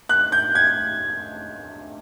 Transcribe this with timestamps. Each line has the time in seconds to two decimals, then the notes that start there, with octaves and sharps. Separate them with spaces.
0.09 F#6
0.32 G6
0.55 G#6